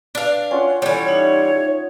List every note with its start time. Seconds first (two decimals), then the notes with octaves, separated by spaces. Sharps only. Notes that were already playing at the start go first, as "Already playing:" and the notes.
0.15 D4 B4 F5
0.51 C#4 F4 F#5 G5
0.82 E3 G3 A4 C#5
1.08 D#4 E5